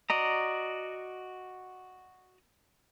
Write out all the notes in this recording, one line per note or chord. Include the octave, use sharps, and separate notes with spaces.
F#4 D5 D#5 A#5